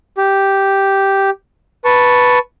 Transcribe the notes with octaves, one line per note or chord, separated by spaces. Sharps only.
G4
B4 A5 C#6